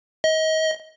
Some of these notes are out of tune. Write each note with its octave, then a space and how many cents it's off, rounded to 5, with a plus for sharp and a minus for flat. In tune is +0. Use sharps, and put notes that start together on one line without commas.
D#5 +30